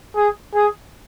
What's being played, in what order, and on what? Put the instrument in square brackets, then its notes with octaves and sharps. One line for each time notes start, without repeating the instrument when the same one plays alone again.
[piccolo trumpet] G#4
G#4